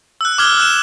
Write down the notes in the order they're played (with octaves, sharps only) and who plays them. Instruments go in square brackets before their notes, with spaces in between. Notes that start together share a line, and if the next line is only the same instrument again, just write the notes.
[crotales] E6 F#6
D6 F6 G#6 G7
F6 F#6 E7